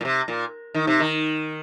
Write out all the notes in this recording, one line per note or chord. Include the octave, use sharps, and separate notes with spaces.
A#2
C3
A#2
D#3
C3
D#3